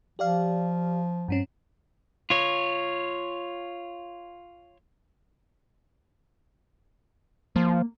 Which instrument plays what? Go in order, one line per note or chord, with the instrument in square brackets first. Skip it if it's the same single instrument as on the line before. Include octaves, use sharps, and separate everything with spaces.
[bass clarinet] F3 [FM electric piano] G4 D5 F5
[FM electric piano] G2 C4 C#4
[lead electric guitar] F4 C#5
[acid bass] F3 [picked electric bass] A#3